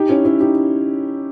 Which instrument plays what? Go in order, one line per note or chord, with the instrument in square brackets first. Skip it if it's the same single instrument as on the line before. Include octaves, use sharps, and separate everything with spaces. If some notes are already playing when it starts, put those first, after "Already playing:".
Already playing: [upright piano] D#4 G4
C#4 E4
C#4 E4
D#4 G4